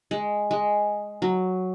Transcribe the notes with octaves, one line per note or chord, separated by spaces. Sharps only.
G#3
G#3
F#3